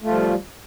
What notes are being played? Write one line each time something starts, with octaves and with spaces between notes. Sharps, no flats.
F3 G3 A3 F4